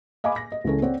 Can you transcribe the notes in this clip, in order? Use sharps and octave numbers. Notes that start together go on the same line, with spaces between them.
D#5 F5 G#5 B5 D6
A#6
D#5
C#2 E3 C#4 A4
C4 C#5 D5 F#5